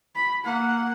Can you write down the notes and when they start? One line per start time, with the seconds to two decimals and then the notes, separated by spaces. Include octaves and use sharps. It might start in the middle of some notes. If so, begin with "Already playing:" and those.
0.15 B5
0.44 A#3 F#5